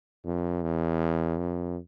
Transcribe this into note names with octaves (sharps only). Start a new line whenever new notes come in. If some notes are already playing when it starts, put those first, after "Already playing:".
F2
E2
F2